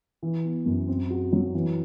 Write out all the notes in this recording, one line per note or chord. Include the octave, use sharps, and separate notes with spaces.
E3
B3
F#2
C4
F#4
F#3
E3